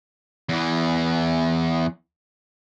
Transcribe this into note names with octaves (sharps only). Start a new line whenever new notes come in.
E2 E3